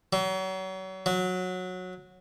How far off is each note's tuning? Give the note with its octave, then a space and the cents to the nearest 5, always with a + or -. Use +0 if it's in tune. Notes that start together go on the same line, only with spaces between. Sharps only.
F#3 +35
F#3 -15